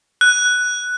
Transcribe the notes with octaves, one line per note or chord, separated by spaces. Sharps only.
F#6